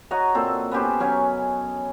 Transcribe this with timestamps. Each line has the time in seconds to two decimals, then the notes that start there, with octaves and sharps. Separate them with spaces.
0.11 F#4 C#5 D#5 A#5
0.35 A#2 C4 A4
0.71 B3 C#4 G4 C5
1.00 F#3 C#4 G#5